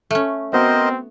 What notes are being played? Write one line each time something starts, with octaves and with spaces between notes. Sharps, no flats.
A3 C#4
B3 C4 F#4 A#4 C5 D#5